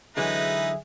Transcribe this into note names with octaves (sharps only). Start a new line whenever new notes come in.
D3 E3 F#3 G#3 D#4 G#4 B4 E5